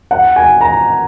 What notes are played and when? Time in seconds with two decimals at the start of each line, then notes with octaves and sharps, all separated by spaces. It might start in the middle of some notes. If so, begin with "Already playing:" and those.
0.11 F#5
0.36 G#5
0.61 A#5